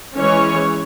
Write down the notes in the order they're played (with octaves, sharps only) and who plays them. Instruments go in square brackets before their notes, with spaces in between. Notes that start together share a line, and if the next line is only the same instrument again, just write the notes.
[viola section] E3 G#3 C#4 C#5